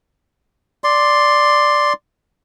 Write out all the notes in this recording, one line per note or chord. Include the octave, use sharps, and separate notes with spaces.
D5 C6